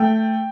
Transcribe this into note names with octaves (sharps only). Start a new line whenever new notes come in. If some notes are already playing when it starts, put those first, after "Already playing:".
Already playing: A3 G5